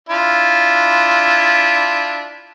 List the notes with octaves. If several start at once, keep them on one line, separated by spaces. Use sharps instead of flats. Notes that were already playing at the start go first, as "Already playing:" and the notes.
D4 E4 F4